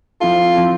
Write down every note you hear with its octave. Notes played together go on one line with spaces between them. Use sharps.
F3 C4 E4 F4 A4
F3 C4 E4 A4